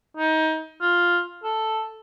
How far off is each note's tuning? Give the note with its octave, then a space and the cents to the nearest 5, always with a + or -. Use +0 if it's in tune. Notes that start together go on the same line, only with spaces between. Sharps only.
D#4 +25
F4 +5
A4 +0